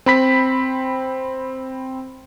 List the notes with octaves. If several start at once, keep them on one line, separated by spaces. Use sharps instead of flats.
C4 B5 B6